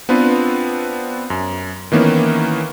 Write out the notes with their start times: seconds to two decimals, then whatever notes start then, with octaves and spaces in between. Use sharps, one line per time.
0.09 B3 C4 D4 F4 B4
1.30 F#2
1.92 D#3 E3 A#3 B3 C#4